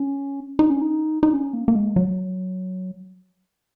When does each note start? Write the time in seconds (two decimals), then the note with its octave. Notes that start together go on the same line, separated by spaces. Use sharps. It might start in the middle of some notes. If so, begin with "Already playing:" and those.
Already playing: C#4
0.59 D#4
0.70 C#4
0.82 D#4
1.23 D#4
1.33 C#4
1.53 A#3
1.68 A#3
1.75 G#3
1.96 F#3